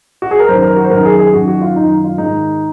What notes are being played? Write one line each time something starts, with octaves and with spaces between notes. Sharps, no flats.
F#4
G#4
A#4
F#2 D#3 C5
A#4
F#4
C5
F#2 D#3 A#4
G#4
G#4
F#2 D#3 F#4
F#4
F4
F#2 D#3 D#4
F4
G#2 D#3 D#4